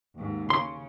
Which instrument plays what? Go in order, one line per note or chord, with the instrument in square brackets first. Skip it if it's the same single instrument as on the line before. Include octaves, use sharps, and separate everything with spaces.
[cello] D#2 G#2
[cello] C#3 [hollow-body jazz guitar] C6